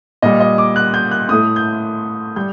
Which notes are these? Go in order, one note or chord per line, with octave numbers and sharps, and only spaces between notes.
A#2 G3 D#5
D#5
D6
F#6
G6
F#6
A2 A3 D#6
G6
G3 G6